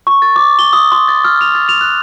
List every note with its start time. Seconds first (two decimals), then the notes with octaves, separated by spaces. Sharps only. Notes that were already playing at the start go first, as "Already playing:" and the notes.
0.07 C#6
0.22 A6
0.36 D6
0.59 G7
0.73 D#6
0.92 C6
1.08 A6
1.24 F6
1.41 F7
1.55 A6
1.69 F7
1.81 F#6